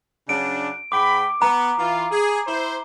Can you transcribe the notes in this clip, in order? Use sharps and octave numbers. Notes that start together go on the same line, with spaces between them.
C#3 F#3 D4 D7
G#2 G5 B5 D6
B3 A#5
E3 F4
G#4
E4 C5